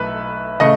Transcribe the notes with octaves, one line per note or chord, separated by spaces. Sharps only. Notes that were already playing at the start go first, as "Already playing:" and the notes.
Already playing: B1 A3 B4 E5
C#3 A3 D#5